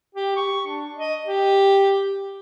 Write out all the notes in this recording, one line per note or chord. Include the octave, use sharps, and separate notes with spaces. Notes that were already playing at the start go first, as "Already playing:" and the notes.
G4
C#6
D4
D#5
G4